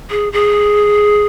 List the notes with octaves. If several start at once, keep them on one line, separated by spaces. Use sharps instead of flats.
G#4
G#4